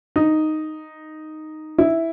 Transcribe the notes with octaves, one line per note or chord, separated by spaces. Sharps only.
D#4
E4